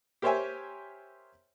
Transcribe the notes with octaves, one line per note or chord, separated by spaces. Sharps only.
G4 A#4 C5 C#5 E5 G#5